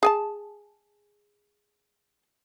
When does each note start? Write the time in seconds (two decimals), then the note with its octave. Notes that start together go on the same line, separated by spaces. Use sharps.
0.03 G#4 G#5 A5